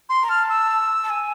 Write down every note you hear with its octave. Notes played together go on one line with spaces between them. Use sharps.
C6
A#5
A5 F6
E6
A5
G#5